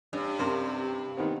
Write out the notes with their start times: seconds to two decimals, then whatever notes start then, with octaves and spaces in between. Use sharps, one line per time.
0.13 G2 C#4
0.39 F#2 C3 A#4 C6
1.17 D#3 B3 C4